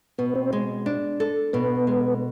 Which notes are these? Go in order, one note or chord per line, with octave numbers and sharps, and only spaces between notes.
B2 B3
C4
G#3
D4
A4
B2 B3
G#3